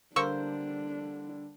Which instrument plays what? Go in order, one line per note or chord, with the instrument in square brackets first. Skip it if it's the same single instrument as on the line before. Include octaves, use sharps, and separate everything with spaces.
[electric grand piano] D3 G3 [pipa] A#3 C5 [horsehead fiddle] D4 [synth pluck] C#6 E6 C#7